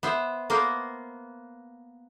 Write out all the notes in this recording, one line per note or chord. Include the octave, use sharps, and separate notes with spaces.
B3 C5 E5
A#3 B3 A#4 C5